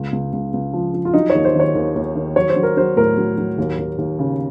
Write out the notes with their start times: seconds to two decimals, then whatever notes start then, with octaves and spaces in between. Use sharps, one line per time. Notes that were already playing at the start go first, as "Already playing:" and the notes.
Already playing: C#2
0.12 C#2
0.33 C#2
0.53 C#2
0.73 F3
0.94 F3
1.05 F4
1.14 F#3 D#4
1.30 C#5
1.35 D#2
1.45 C5
1.55 D#3 C#5
1.75 D#2
1.95 D#2
2.15 D#3
2.36 F#3 C#5
2.50 C5
2.56 F#3
2.63 A#4
2.77 F#3 C5
2.97 A2 A#4
3.18 F#3
3.37 F#3
3.58 D#2
3.78 D#2
3.98 D#2
4.19 C#3